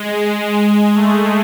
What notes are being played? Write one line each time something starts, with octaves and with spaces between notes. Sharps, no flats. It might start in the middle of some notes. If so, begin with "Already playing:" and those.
Already playing: G#3
G#3
A3